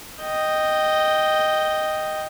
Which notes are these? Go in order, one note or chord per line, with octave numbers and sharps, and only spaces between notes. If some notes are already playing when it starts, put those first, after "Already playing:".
D#5 G5